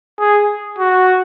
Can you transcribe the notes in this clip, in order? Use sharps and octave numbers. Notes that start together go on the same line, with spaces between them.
G#4
F#4